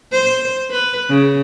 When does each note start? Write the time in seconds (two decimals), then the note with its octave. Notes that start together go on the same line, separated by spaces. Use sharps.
0.12 C5
0.70 B4
1.09 C#3